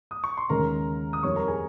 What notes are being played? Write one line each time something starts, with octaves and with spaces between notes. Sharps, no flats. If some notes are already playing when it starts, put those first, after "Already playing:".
D#6
C#6
C6
D#2 C#3 G#3 C#4 A#4 A#5
D#6
F2 D#3 G3 C#5 C#6
A#4 A#5
G#4 G#5